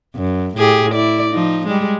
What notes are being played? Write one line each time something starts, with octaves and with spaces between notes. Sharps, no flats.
F#2
A2 G4 G#4
E4 D5
F3 D#4
G3 G#3